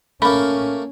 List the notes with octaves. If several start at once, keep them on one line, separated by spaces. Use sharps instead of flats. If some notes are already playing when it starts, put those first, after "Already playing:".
A3 A#3 C#4 B5